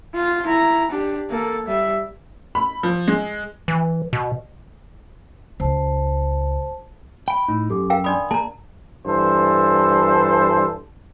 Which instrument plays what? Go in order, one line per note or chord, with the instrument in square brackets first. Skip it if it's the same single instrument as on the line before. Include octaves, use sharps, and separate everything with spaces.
[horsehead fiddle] F4
E4 A#5
D4 G4
A#3 A4
G3 E5
[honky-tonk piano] B5
F3
G#3
[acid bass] E3
B2
[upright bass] C#2 [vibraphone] C5 A5
[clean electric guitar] G5 [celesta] B5 D7
[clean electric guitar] A2 D#4
[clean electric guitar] F#2 [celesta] G4 A4 D6
[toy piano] A#4 F5 G5
[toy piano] D4 D5 B5 [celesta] C6 D#6
[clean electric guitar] A#3 G#4 [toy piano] A5 A#5
[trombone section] G2 E3 A4 C5